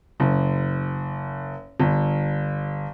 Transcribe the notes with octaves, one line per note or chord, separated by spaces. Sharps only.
F#1
G1